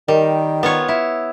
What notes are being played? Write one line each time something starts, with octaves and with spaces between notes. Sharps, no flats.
D#3 G3
B3 F4 C#5
E4